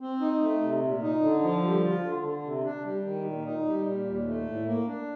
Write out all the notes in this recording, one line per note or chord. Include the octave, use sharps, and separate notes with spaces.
C4
D#4
A3
C3
A#2
D#4
D3
F3
G3
F4
D3
D3
C3
D4
G3
D#3
A#2
D#4
G3
A#2
D#2
A3
A2
A#3
D4